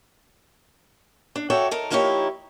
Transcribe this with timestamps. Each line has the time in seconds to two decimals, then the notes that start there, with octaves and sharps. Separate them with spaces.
1.36 D4
1.50 F#4 A4 C#5 D5 E5 G5
1.71 D#4 A4 A#4
1.91 F3 A#3 D#4 E4 G4 C#5